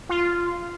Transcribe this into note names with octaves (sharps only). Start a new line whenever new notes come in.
F4